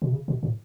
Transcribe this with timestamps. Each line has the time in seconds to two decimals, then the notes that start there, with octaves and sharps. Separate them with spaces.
0.02 B2
0.12 C#3
0.28 B2
0.43 A2